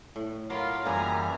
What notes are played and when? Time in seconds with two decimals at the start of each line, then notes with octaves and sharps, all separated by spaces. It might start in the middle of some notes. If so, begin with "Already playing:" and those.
0.16 A2
0.50 F#3 F4 A#4 F5 B5 C6 D6
0.85 F#2 E3 G3 A#3 G#4 G#5 A#5